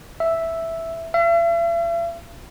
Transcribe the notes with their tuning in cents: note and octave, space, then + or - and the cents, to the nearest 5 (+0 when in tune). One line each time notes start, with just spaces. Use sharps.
E5 +0
E5 +45